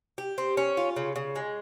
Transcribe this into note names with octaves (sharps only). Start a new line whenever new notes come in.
G4
C4
C#4
F4
C#3
C#3
G#3